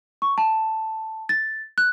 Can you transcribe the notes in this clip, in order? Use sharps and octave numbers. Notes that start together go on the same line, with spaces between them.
C#6
A5
A6
F#6